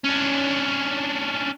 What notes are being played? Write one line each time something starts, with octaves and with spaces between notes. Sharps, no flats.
C#4 D4